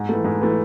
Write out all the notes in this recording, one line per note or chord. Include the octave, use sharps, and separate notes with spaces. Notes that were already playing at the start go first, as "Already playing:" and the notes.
Already playing: G#2
E3 A3
G#2
E3 A3